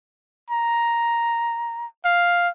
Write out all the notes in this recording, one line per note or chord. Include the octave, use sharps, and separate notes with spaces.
A#5
F5